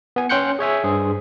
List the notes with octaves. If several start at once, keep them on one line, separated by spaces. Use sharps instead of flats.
B3 G#5
C#4 G5 C6 F#6 G6 C#7
G#4 C#5 E5 G#5
G2 G#4 C5